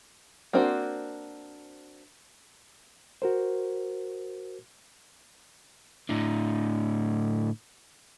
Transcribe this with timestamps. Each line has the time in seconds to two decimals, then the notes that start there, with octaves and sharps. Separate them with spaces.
0.53 A#3 C4 D4 F#4 C5
3.22 F#4 A#4 C5
6.09 A2 D3